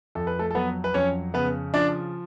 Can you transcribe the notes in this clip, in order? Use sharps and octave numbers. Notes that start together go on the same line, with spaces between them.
F2 A4
B4
A3 A4
A4
F#3 B3 B4
B4
F2 C#4 C#5
C#3 B3 B4
F3 D4 D5